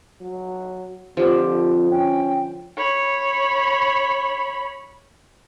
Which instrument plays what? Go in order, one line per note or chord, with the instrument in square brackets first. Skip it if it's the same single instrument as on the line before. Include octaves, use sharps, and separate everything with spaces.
[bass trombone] F#3
[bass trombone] F2 [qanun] D3 F3 [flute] G4
[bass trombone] C#4 [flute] G5
[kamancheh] C#5 B5